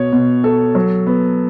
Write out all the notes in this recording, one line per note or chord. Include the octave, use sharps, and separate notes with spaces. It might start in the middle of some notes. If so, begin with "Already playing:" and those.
Already playing: B2 C#5
B2
A4
F#3
B3